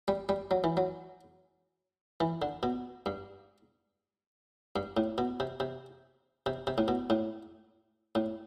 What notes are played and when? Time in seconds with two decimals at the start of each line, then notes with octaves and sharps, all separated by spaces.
0.08 G3
0.29 G3
0.51 F#3
0.64 E3
0.77 F#3
2.20 E3
2.42 D3
2.63 B2
3.06 G2
4.76 G2
4.97 A2
5.18 B2
5.40 C3
5.60 C3
6.46 C3
6.67 C3
6.78 A2
6.88 B2
7.10 A2
8.15 A2